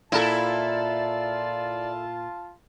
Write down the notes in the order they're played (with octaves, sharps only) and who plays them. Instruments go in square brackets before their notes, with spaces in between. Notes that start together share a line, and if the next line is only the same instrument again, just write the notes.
[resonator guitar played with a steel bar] A#2 [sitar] E4 A4 [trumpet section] F4 A5 [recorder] D5